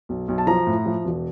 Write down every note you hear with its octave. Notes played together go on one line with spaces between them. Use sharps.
B1
B1
A5
F3 A#5
A2
F3
E1